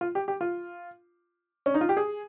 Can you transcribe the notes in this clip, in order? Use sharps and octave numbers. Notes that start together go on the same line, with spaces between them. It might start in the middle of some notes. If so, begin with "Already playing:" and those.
F4
G4
G4
F4
C#4
D#4
F4
G4
G#4